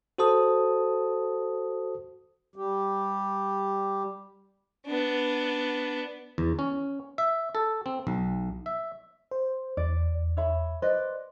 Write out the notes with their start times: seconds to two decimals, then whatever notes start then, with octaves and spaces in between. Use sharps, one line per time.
0.18 F#4 A4 C5 A5 D#6
2.56 G3 G4
4.87 B3 D4
6.38 E2
6.59 C#4
7.18 E5
7.55 A4
7.86 C4
8.07 B1
8.66 E5
9.31 C5
9.77 E2 D5
10.37 C#5 E5 B5
10.82 B4 C5 D5 D#5